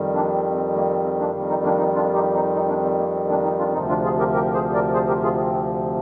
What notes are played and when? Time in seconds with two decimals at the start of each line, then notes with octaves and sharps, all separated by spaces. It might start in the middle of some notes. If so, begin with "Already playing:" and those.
Already playing: F2 D#3 G3
0.14 A#3 D4
0.35 C4
0.55 C4
0.75 A#3
0.90 C4
1.04 C4
1.19 A#3 D4
1.34 F2 D#3 G3
1.49 C4 D#4
1.64 A#3 D4
1.79 C4 D#4
1.94 D4 F4
2.14 D#4 G4
2.34 C4 D#4
2.54 C4 D#4
2.69 A#3 D4
2.84 C4
2.99 A#3
3.14 C4
3.29 A#3 D4
3.44 C4 D#4
3.59 D4 F4
3.73 D2 C3 F3 C4 D#4
3.89 D4 F4
4.04 F4 G#4
4.19 G4 A#4
4.34 G4 A#4
4.53 G#4 C5
4.74 A#4 D5
4.93 G#4 C5
5.08 G4 A#4
5.23 F4 G#4
5.39 C4